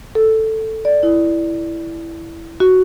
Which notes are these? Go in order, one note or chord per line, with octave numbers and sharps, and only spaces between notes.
A4
D5
E4
F#4